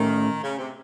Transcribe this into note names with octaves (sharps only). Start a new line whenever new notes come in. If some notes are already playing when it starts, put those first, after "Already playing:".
Already playing: A2 D#3 A3 C#4
C#3
C3